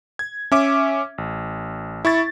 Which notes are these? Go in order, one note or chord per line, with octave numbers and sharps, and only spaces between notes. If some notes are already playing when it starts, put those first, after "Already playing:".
G#6
C#4 E5 D6
A1
E4 C#6 A6